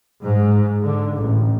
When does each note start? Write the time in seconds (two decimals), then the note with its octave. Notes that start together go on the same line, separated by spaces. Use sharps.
0.21 G#2
0.83 D3
1.16 A1